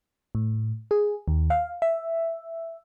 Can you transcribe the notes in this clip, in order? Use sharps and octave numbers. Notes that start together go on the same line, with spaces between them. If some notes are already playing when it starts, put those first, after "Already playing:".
A2
G#4
D#2
F5
E5